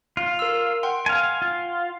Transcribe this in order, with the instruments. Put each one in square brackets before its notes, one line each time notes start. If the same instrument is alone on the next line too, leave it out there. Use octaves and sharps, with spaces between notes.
[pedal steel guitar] F4
[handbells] A#4 E6
F#5 G5 C6
[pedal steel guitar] F5 G#5
F4